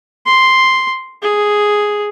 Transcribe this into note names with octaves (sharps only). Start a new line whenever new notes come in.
C6
G#4